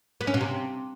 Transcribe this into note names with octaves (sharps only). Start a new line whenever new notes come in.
B3
C#4
B2
C3